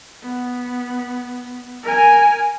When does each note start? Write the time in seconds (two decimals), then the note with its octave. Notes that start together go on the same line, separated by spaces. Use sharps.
0.23 B3
1.83 A#4 G#5